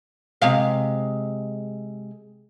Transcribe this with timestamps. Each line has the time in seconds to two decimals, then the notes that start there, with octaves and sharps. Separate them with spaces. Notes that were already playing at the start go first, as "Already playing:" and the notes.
0.42 C3 G#3 F5